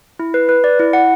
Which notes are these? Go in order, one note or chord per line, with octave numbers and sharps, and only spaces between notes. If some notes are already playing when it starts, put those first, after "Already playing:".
E4
B4
B4
D5
E4
F#5